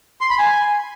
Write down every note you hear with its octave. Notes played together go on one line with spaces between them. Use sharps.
C6
B5
G#5